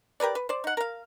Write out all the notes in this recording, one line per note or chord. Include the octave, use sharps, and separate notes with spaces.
G4 A#4 B4 D5
B4
C5 D5
D#4 F#5
A#4 F5